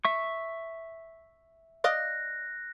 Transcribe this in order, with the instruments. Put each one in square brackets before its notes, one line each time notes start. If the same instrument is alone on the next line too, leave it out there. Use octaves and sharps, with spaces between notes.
[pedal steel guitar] E5 C#6
[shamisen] D5 D#5 F5 [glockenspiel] F#6 A#6